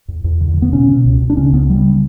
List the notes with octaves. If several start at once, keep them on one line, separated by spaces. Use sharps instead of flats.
E2
E2
D3
D3 B3
B2 C#4
B2
C#2
C#2
D4
C#3 C#4
C#2 B3
C#3 G3